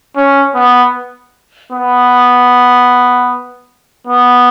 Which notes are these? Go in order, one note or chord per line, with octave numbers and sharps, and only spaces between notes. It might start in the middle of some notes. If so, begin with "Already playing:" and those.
C#4
B3
B3
B3